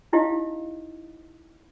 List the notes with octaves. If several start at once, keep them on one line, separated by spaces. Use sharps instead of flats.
C#4 D#4 E4 G4 D#5 F5